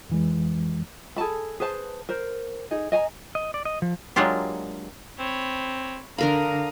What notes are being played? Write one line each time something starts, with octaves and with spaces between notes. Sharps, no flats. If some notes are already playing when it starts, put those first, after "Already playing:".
F2 E3 G#3
G#4 A4 A5 B5
G#4 B4 C5 A5
A#4 C5
D#4 G#4
D#5 G#5 A#5
D#5
D5
D#5
F3
F#3 G#3 A#3 D4 F4 G4
C4 C#5 B5
D3 D4 A#4 F5 A#5 B5 D#6